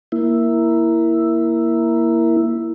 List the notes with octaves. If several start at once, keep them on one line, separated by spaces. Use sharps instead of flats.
A#3 E4